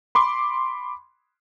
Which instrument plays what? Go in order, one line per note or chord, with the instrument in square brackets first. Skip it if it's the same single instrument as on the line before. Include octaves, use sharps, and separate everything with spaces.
[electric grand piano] B5 C6 D6